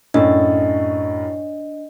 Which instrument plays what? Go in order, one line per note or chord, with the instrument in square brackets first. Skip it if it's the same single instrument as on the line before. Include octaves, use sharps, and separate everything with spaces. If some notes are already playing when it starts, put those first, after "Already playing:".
[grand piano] F#2 A2 [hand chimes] D4 D#5